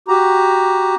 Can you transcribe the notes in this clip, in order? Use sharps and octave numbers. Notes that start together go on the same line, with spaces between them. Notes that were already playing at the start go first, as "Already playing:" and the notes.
F#4 G4 A#5